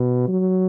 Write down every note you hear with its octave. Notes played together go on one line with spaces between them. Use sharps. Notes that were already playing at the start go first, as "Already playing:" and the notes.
Already playing: B2
F#3